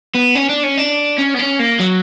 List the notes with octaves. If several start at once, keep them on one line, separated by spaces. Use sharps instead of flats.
B3
C#4
D4
C#4
D4
C#4
B3
C#4
A#3
F#3